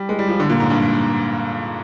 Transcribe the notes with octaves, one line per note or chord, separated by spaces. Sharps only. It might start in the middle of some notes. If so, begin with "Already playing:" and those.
Already playing: G3
G#3
G3
F3
D3
A#2
G#2
G2